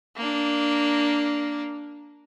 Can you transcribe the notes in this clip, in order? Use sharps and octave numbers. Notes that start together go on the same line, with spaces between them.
A#3 D4